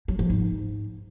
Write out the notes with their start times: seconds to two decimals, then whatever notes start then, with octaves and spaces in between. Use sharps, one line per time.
0.08 F#3
0.19 F3
0.30 G#2